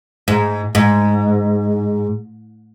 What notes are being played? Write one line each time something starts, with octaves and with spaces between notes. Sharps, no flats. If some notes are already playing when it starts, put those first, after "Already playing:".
G#2
G#2